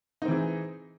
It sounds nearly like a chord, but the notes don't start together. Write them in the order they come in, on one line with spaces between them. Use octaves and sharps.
D#4 C4 E3 G#4